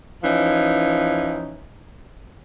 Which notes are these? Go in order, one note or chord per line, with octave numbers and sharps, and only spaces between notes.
E3 F3 C#4 D#4